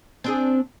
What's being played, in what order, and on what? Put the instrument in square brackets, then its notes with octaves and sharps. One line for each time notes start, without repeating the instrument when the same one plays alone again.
[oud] C4 D4 G#4